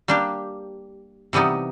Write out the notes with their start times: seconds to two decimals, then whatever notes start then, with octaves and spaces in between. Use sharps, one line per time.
0.08 G3 A#3 D4 G4
1.33 C3 E3 G3 B3 D#4